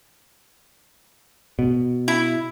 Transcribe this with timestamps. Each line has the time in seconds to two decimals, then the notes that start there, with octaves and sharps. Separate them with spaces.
1.59 B2
2.08 E4